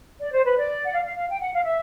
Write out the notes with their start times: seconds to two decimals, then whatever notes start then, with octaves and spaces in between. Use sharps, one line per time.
0.20 D5
0.32 C5
0.45 B4
0.57 D5
0.85 F#5
0.93 F5
1.05 F5
1.17 F5
1.29 G5
1.40 F#5
1.53 F5
1.64 E5